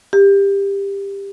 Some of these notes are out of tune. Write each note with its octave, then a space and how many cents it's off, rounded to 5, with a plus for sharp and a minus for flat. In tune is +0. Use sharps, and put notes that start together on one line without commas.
G4 +20